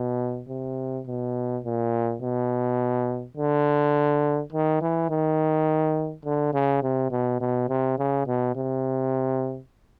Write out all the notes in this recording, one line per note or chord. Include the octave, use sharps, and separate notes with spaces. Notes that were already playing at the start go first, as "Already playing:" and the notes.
Already playing: B2
C3
B2
A#2
B2
D3
D#3
E3
D#3
D3
C#3
C3
B2
B2
C3
C#3
B2
C3